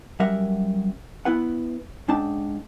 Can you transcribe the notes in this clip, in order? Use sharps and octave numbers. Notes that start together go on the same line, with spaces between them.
F#2 G3 A#4 E5 F#5
B3 E4 B4 F#5
G#2 C#4 D4 G5 A5